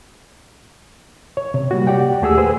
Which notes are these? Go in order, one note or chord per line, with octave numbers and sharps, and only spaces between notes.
C#5
C3
G3 A#3 F#4
G4 D5 F#5 G5
D#2 A3 G4 G#4 F#5 E6
G#4 B4 C5